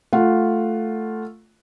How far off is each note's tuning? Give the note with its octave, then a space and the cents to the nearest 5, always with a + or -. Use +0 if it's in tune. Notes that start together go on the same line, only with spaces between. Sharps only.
A3 +0 F4 +0 F#5 +0